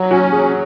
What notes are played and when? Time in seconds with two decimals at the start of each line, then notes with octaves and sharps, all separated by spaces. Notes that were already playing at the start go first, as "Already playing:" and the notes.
Already playing: F#3 F#4
0.11 C#4 F#4
0.32 F#3 G#4